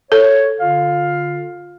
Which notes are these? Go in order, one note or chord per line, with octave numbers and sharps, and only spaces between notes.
A4 C#5
D3 F4 F5